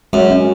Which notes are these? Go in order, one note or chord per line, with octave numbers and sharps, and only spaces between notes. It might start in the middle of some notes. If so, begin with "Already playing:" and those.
F#2 G#3
C#4